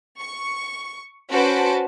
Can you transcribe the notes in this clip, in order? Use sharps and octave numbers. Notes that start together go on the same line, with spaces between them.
C#6
C#4 F#4 B4 C5 A5 D7